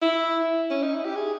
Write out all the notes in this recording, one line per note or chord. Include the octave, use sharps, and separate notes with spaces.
E4
C#4
D#4
E4
G4
G#4